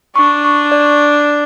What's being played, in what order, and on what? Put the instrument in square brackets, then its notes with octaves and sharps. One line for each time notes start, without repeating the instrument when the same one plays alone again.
[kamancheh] D4 [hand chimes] C#6
[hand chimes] C#6
D5